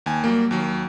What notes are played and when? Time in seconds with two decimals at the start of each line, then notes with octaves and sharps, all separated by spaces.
0.06 D#2 G#5
0.24 F#3 G3 A#3
0.51 D#2 F#3